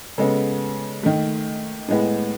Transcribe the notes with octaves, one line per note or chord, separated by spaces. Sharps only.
C#3 G#3 B3 A4
D#3 A3
A2 G#3 B3